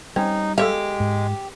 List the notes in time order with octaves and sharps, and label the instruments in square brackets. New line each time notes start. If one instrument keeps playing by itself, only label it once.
[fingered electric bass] G3 [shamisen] C4 C#4 [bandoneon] D#4
[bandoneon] G#3 [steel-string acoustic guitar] G4 [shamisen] A4 E5 F5
[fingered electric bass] G#2